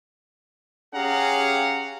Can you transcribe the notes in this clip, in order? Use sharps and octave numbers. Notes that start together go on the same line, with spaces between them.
C#4 G4 G#4 F5 F#5 A#5